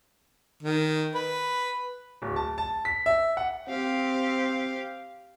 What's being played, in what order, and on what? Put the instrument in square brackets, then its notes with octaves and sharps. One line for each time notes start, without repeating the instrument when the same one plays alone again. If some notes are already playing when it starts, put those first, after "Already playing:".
[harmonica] D#3
B4
[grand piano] D1
A5
A5
B6
E5
F#5
[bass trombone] C4 [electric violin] G4 F5